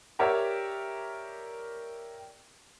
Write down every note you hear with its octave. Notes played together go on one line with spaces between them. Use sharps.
G4 A#4 C#5 D5 E5